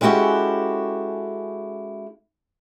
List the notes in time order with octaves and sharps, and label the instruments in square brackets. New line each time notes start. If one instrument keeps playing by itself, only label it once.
[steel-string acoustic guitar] G#3 C#4 E4 F#4 G4 A4